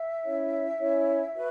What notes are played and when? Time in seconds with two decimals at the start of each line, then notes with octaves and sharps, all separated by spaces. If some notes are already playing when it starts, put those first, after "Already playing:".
Already playing: E5
0.24 C#4 E4 C#5
0.78 C#4 E4 C#5
1.33 F#4 B4